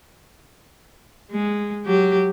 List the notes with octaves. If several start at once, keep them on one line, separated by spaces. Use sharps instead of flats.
G#3
F#3 G4